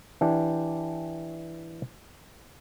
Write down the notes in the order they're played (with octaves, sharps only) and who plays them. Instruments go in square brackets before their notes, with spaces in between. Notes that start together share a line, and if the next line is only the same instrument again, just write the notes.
[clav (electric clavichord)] E3 D4 G4